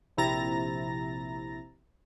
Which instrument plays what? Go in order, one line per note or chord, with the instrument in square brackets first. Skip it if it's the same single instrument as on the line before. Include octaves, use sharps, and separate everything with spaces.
[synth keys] A#1 C3 E4 A#5 A6 A#6